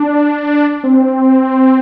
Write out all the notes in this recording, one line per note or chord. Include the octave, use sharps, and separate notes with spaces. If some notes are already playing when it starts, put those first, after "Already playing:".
Already playing: D4
C4